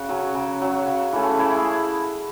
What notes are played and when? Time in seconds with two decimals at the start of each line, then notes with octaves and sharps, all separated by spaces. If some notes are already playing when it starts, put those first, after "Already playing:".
Already playing: C#3 F#4
0.09 F#3 C#4
0.35 C#3
0.61 F#3 C#4
0.86 C#3
1.13 E3 A3 C#4
1.39 E3 E4
1.56 G#4